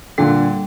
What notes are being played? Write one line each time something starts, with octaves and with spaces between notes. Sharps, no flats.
A#2 D3 G3